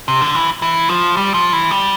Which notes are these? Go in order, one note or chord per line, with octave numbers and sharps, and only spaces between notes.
C3
D3
E3
E3
F3
G3
F3
E3
G3